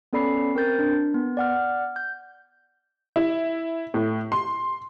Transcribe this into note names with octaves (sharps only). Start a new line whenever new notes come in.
B3 C#4 A4 D5 B5 C7
C4 A#4 G6 A6
D4
B3
D5 F#5 F6
G6
E4
A2
C6